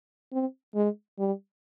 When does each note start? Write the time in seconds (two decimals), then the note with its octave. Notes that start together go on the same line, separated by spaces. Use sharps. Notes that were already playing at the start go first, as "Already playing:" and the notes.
0.33 C4
0.75 G#3
1.19 G3